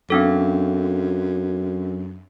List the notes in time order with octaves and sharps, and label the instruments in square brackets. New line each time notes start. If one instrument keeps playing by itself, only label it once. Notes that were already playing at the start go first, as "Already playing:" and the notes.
[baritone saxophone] F#2 [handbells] C4 D4 A4